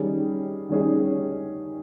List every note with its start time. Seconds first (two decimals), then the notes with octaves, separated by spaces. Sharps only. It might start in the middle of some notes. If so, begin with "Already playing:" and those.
Already playing: D#3 G3 C#4 G#4
0.69 D#3 G3 C#4 G#4